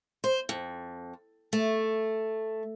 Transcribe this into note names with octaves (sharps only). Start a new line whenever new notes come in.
C5
F2
A3